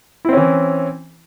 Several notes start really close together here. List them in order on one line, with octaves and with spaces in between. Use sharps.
E4 C4 C#4 E3